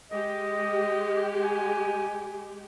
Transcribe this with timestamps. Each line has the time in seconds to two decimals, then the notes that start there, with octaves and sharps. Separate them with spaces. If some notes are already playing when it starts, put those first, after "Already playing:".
0.11 G#3 G4 D#5
1.44 G#5